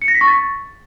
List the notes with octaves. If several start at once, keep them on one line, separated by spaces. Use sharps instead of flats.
C#7
A#6
B6
C#6
A6